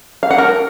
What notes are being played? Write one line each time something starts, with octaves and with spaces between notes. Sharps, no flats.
F5
F#5
A#4